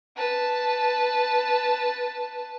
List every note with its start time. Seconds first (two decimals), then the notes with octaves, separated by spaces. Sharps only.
0.17 B4 A5